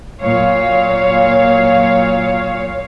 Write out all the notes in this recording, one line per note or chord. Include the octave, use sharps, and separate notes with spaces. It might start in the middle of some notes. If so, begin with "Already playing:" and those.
A#2 F#3 C#5 F5